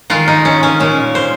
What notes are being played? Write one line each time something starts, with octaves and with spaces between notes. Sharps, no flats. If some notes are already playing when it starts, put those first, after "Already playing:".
D#3 G#3 F4
D#4
C#4
C#4
A#2 G#3 C#4
C5